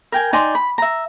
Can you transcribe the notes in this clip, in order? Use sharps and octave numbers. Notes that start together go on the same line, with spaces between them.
A#4 G5 G#5
D#4 D5 G#5 C6
B5
E5 A#5